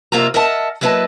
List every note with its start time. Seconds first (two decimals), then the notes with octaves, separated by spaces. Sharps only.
0.12 F2 C3 A#3 F4 E5 A#5
0.34 A#4 D#5 E5 F#5 A5
0.81 F#3 A#3 E4 B4 D#5 A5